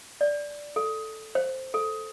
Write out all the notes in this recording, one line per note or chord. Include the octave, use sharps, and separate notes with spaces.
D5
A4
C5
A4